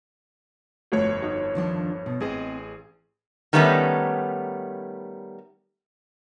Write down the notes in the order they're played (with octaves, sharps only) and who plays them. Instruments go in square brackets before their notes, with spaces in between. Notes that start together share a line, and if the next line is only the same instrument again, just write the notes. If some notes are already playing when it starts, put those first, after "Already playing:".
[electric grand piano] G1 F2 C#5 [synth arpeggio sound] A3 F#4
[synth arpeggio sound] D#4 F#4
[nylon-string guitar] D#2 F3 D4
B2
[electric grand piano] A1 G#4 [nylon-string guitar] C4 D#5
[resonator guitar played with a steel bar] D#3 G3 A3 B3 C#4 D#4